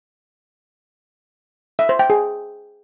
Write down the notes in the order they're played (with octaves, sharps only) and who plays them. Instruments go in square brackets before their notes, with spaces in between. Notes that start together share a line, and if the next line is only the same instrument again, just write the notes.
[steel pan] E5
C5
G5
G#4